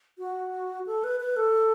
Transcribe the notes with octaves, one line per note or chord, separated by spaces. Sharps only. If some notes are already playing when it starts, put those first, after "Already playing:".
F#4
A4
B4
B4
A4